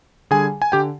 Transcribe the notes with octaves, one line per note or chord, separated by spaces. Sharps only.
D3 G3 G#4 G#5
G#5
D3 G4 G5